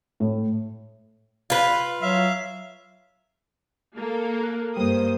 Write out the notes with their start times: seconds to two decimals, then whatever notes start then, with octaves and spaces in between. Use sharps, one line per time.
0.20 A2
1.50 F4 B4
2.02 F#3 E5 F5
3.97 A#3 A4
4.41 A#4 F#6
4.76 G2 G3 A#3 C5 D#6